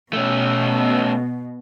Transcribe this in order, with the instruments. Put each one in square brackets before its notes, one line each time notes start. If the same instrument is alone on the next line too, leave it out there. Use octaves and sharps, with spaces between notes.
[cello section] B2 [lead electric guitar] A3 C#4